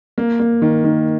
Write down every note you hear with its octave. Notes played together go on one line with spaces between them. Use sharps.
A#3
A#3
D#3
D#3